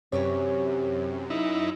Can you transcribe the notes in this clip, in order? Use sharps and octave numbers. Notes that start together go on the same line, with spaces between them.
F#2 C3 E3 G4 C#5
D#4 E4